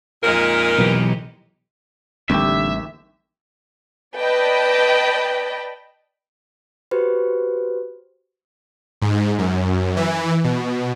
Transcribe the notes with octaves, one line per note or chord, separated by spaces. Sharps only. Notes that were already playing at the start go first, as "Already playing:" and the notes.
F2 A#2 G#3 D#4 A#4
B1 E3 G4
A1 D#2 D3 G3 C4 G4 E5
B4 D5 D#5 G5 A5 B5
F#4 G4 B4 C5
G#2
F#2
E3
B2